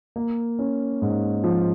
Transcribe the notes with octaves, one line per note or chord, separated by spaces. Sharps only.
A#3
C#4
G#2
F3